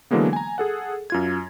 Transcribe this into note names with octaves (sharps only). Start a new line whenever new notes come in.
D3 E3 F#3 G#3 A#3 B3
G#5 A#5
G#4 A4 F#5
F#2 F4 G#6